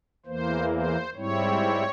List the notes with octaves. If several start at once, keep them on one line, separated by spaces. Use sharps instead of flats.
E2 E3 A#3 C5
C5
G#2 G3 C4 E4 C#5